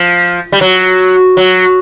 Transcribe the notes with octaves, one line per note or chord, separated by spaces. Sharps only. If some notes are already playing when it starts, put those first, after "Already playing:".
Already playing: F3
G3
F#3
F#3